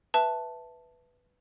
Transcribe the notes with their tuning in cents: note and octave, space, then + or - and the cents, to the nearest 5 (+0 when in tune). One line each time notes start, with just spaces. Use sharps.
B4 +0 E5 +0 A5 +0